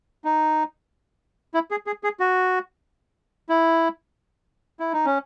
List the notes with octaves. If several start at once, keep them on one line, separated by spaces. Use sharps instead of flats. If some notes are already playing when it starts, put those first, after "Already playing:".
D#4
E4
G#4
G#4
G#4
F#4
E4
E4
D#4
C#4